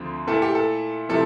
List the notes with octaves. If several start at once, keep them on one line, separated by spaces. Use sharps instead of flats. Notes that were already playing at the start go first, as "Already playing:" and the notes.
Already playing: D2 D3 F3 C4
A#2 A3 E4 A4
G4
A4
C3 F3 A3 E4 A4